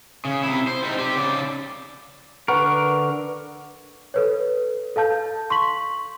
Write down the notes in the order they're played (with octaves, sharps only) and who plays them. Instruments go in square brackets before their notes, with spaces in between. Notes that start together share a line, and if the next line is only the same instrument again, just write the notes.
[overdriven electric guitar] C#3
C3 E4
C5
G3 D#4
G4 C5
C#3 D5
[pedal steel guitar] D3 A#4 [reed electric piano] B4 F#5 C#6
[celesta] A4 B4 C#5
A4 F5 A5 G6
C6 C#6 B6 F#7